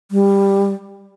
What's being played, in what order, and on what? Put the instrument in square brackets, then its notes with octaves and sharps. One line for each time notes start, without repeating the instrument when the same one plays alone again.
[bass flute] G3